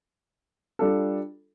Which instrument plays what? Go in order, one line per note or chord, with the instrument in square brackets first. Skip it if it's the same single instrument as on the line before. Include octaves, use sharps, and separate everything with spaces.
[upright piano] G3 D4 F4 A4